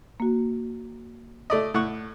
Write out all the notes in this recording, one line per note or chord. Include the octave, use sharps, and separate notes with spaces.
A#3 F#4
A3 D5 D#5
A2 F#5 C#6